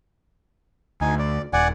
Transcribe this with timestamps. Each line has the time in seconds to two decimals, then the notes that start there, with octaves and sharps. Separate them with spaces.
1.01 D2 D#4 G#5
1.19 D5
1.53 D#1 D5 F#5 G#5